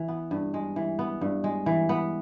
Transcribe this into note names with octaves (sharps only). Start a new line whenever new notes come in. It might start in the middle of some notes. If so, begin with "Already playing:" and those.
Already playing: E3
B3
G2
G#3
E3
B3
G2
G#3
E3
B3